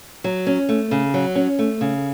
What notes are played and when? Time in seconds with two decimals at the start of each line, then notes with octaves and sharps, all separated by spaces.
0.24 F#3
0.47 C#4
0.69 A3
0.91 C#3
1.14 F#3
1.35 C#4
1.59 A3
1.81 C#3